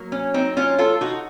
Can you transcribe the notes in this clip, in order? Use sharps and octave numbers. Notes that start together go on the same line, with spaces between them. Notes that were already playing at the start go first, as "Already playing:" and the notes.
Already playing: F#3 A#3
C#4
C4 D#4
C#4 F4
F4 A4
D#4 F#4